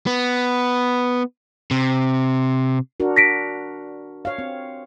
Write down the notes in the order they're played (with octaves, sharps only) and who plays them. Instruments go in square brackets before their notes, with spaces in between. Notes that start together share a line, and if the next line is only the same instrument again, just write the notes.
[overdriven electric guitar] B3
C3
[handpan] D4 F#4 A#4
[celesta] A#6 B6 D7
[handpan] C#5 F5
C4